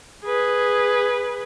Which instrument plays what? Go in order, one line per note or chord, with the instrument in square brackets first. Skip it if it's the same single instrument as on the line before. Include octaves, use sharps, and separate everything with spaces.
[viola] G#4 B4